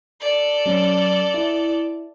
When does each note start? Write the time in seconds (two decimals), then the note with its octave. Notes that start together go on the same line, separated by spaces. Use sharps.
0.21 A4 D5
0.66 F#3 C#4
1.34 E4